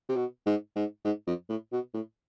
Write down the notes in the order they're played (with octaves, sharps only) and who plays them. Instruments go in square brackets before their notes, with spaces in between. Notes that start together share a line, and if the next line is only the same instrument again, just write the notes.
[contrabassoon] C3
B2
G#2
G#2
G#2
F2
A2
B2
A2